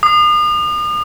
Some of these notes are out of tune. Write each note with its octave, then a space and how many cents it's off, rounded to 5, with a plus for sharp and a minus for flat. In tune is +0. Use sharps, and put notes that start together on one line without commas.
D#6 -40